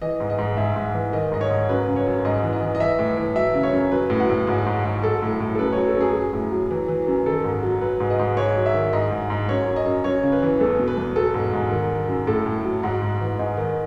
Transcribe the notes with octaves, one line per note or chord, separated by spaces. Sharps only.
E3 D#5
G#2
D#5
G#2
G#2 E5
G#2
E3
D#3 D#5
G#2 D#5
C#5
G#2
F#2 B4
C#3
C#5
F#2
G#2 D#5
E3
D#5
E3
D#5
E3 E5
A2
E3
F#3 E5
C#3
C#5
F#2
F#3 B4
A2
F#4
A2
G#2 F#4
G#2
G#2
F#3 A4
A2
A2
A4
F#2 B4
F#3 C#5
A4
F#2 G#4
F#3
A2
F#3
E3
E3
F#2
D#3 A4
G#2
F#3
F#3 B4
G#2
D#5
G#2
G#2 C#5
F#3
E5
D#3
G#2 D#5
G#2
G#2
F#2 C#5
F#2
D#5
F#2
F#2 C#5
C#3
B4
E3
E2 A4
B2
B4
E2
F#3 A4
G#2
G#2
D#3
D#3
F#2
A2 A4
A2
F#3
G#2 F#4
G#2
E3
G#2 D#4
D#3